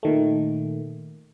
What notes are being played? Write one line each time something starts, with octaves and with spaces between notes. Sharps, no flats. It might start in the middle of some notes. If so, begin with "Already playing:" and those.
A#2 D#3 A3